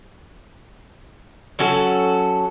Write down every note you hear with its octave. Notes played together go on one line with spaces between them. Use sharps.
F#3 C#4 F#4 A4